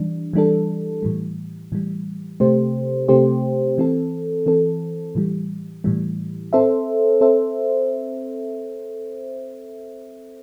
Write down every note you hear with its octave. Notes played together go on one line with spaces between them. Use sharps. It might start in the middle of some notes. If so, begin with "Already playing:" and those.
Already playing: E3 G3 D4
E3 G3 D4 A4
A2 E3 G3
A2 E3 G3
C3 A3 C4 G4 C5
C3 A3 C4 G4 C5
E3 C4 A4
E3 C4 A4
A2 E3 G3
A2 E3 G3
C4 A4 C5 E5
C4 A4 C5 E5